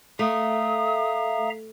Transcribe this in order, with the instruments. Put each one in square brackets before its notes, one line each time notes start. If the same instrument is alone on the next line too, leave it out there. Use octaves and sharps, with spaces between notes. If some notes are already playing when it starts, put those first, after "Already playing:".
[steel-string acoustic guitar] A3 [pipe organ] E5 F5 A#5 [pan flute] D#6